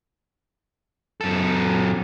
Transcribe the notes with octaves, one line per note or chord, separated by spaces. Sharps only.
F#2 A4